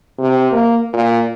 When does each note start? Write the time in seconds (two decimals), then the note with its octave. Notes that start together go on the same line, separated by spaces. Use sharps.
0.19 C3
0.52 A#3
0.93 A#2